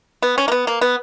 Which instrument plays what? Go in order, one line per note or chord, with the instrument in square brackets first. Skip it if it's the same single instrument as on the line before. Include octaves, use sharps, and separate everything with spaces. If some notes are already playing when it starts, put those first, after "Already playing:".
[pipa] B3
C#4
A#3
B3
A#3
B3